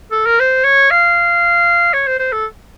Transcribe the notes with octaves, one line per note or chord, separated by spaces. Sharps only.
A4
A#4
C5
C#5
F5
C#5
C5
C5
A4